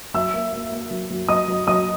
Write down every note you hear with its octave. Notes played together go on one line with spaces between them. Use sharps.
F#3 E5 E6
A#3
A#3
A#3
F#3
F#3
F#3 D#5 D#6
F#3
F#3 D#5 D#6